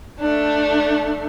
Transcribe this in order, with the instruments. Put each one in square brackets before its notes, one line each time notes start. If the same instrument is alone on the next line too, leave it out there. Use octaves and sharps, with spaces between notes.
[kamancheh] A3 D4